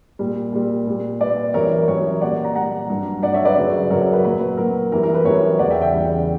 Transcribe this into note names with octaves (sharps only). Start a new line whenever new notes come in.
A#2 G3
A#2 G3
A#2 G3
A#2 G3 B4 D5
F#2 E3 G3 A#4 C#5
F#2 E3 G3 A#4 C#5
A#2 G3 D5 F#5
F#5 A#5
A#2 G3 F#5 A#5
G2 F#3
G2 F#3 D5 F#5
C#5 E5
B4 D5
F#2 C#3 F#3
F#2 C#3 F#3 A#4 C#5
A#4
B4
A#2 F#3 B4
A#2 F#3 A#4
F#2 E3 G3 A#4
A#4
B4
F#2 E3 G3 A#4 C#5
E2 C#3 G3 D5 F#5
E5 G5
E5 G5
E2 C#3 G3